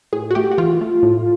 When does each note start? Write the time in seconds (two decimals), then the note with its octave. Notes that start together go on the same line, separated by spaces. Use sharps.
0.13 A2 G#4
0.31 F#4
0.35 A3 G4
0.51 F#4
0.58 E3 F4
0.81 A3
1.03 A2